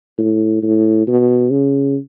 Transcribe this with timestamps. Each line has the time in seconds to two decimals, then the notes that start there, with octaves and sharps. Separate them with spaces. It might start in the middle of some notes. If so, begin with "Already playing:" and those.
0.18 A2
0.63 A2
1.07 B2
1.51 C#3